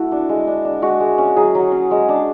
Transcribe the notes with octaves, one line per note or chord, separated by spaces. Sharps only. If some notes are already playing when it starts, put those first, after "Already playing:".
Already playing: A3 E4 F#4 A4
D4
G#3
D4
D4
G#3 F#4
G#3
C#4
F#3 G#4
F#3
C#4
G#3
D4